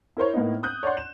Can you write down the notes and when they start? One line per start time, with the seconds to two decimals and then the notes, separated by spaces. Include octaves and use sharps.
0.17 E4 A#4 C5 C#5
0.34 A2 A#3 B3 D#4
0.63 D#6 F#6 G6
0.83 C#5 D5 F#5 C6
0.97 E7